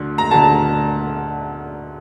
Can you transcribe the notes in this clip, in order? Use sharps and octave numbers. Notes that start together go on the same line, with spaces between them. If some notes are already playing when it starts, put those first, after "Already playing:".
Already playing: D2 D3
A#5
D2 D3 A5